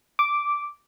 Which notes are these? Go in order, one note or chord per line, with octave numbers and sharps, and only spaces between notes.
D6